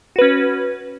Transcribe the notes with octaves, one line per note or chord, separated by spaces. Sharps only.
C#4 F#4 B4